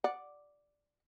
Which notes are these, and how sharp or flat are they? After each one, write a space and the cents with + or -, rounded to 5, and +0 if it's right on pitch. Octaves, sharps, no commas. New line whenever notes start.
D5 +0 F#5 +0